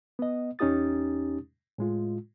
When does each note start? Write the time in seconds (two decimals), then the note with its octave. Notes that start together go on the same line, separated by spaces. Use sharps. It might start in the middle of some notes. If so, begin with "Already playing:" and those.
0.19 B3 D#5
0.59 E2 C#4 D#4 G4 D#6 A6
1.78 A2 G#3 F4